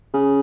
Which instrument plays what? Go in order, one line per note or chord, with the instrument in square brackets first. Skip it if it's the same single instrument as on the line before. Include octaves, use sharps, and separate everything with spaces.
[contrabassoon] C#3